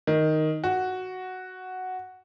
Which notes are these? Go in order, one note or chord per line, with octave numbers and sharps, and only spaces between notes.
D#3
F#4